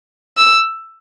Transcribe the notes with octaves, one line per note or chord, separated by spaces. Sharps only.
E6